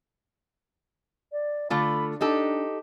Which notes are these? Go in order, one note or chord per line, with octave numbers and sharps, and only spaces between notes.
D5
D3 A3 F4 B5
D4 D#4 G4 A4